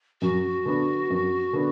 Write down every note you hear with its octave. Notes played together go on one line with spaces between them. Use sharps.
F#2 F#4
D3 B3 D4
F#2
D3 B3 D4